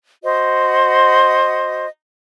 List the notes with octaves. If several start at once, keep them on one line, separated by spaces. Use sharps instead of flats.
F#4 C5 D#5